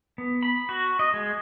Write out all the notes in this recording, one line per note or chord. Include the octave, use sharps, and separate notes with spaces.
B3
B5
F#4
D#5
G#3